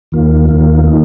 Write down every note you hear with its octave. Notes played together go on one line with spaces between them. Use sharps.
D#2 D#3 A#3 F4
D#2 D#3 A#3 F4
D#3 A#3 D#4